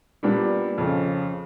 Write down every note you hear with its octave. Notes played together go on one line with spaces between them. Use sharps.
A#2 G3 B3 D4
F2 C#3 F3